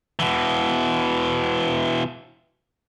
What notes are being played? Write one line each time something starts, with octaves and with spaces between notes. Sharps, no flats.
B2 E3